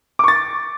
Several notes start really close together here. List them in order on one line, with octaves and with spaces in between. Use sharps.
D6 C#6 A6